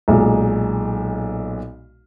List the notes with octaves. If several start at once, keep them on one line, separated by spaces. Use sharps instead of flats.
B1 A#2 G#3